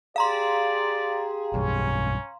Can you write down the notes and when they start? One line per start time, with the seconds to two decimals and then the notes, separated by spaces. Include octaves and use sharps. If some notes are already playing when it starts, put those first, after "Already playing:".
0.16 G4 G#4 D5 F5 A#5 C6
1.54 B1 G2 C#4